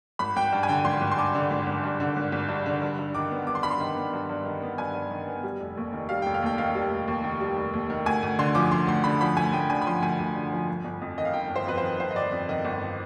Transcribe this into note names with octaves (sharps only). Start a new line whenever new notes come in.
G#1 B5
G#1 G5
G2
G#5
D3 G5
G#1 C6
G#1
C6
G2 D6
D3
G#1
G#1
G2
D3
G#1
G#1
G2
D3
G2
G2
D#3 D6
B3
G2 D6
C6
G2 B5
C6
D#3
B3
G2
G2
D#3
B3
G2 G#5
G2
D#3
B3
G3
F1
D#2
D#3
G3 F5
F1 G5
F5
D#2 G5
D#3 F5
G3
F1
D#2
D#3
G3
F1
D#2
D#3
D2 G#5
D2
D3 C6
F3 D6
D6
D2 C6
D2 C6
D3 B5
F3 B5
D2 G#5
D2 G5
D3 G#5
B5
F3 C6
D2 G#5
D2
D3
F3
G1
G1
F2
D#3 D#5
F5
G1 G5
G1
C5
F2 B4
C5
D#3
G1 C5
D#5
G1 D5
F2
D#3 D#5
G1